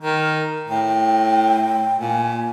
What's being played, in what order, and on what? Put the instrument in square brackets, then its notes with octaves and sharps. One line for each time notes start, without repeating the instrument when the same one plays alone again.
[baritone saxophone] D#3 [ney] A#4
[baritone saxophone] A2 [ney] G5
[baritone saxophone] A#2 [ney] G#5